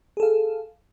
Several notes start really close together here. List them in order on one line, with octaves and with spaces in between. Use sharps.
G#4 A4 F5